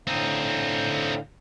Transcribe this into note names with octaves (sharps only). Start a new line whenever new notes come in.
A2 D3 C4 D#4 F5